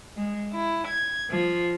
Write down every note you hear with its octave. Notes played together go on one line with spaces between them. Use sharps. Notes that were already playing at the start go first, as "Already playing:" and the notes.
G#3
E4
G#6
F3